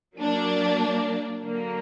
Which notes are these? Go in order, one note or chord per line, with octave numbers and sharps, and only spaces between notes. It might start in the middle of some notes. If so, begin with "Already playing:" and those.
F#3 A#3 D4
D3 F#3 A#3